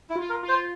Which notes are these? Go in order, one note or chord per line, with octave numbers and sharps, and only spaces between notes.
E4
F4
A#4
F4
C5